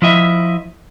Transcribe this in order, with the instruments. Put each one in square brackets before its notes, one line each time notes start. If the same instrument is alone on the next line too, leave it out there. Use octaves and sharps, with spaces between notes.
[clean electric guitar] F3 E4 D#5 E5